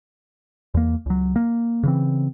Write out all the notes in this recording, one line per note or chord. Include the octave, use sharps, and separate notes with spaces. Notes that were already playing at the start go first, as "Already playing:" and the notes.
E2 A#3
C#2 F#3
A#3
C#3 E3 C4